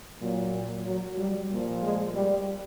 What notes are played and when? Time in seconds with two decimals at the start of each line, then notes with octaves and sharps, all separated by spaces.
0.20 A#2 F#3
0.86 F#3
1.18 G3
1.50 A#2 F3
1.82 G#3
2.14 G3